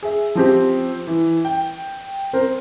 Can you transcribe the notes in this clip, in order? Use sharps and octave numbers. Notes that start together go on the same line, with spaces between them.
G#4 E5
F3 C4 G4
E3
G5
C4 A#4 C5